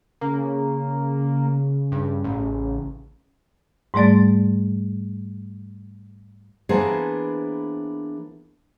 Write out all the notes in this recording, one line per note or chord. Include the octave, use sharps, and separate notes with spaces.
C#3 A#3
G2
A1
G#2 G3 A3 D5 A6
E3 A#3 B3 D4 G#4 C5